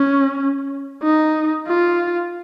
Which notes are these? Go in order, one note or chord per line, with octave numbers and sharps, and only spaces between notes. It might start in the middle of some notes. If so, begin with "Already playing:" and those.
Already playing: C#4
D#4
F4